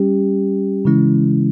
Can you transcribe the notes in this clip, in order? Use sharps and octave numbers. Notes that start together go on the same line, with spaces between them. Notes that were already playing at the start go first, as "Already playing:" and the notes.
Already playing: G3 C#4 G4
C#3 E3 G#3 C#4 E4